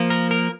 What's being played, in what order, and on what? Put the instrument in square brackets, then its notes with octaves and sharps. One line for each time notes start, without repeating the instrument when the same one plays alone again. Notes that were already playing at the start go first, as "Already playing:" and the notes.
Already playing: [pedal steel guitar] F3 A#3
A#4
A#4